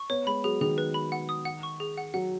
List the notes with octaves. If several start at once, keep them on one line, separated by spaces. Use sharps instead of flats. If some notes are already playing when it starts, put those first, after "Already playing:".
Already playing: C#6
B3 C#5
G#3 B5
F#3 G#4
D#3 G#4
B4
B5
F#5
D#6
F#5
C#6
G#4
F#5
F#3 F#5